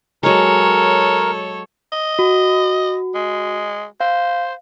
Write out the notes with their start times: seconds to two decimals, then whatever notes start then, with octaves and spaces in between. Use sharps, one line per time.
0.23 F#3 G#3 A4 A#4 C#5
1.93 D#5
2.19 F#4
3.15 G#3
4.00 C5 F5